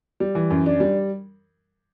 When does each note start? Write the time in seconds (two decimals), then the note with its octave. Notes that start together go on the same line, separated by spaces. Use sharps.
0.20 G3
0.35 E3
0.50 F#2
0.66 D4
0.80 G3